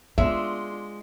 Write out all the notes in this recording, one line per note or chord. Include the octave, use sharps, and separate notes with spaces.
G#3 B3 D4 F4 E5